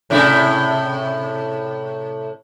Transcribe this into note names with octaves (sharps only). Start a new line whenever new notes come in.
A2 C3 E4